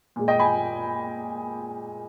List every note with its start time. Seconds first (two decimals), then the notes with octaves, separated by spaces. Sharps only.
0.16 A#2 G#3
0.28 D#5 G5
0.39 G#5 B5